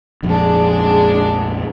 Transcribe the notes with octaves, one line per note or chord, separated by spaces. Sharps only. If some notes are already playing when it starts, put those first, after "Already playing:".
A#1 F2 G#2 G#3 D4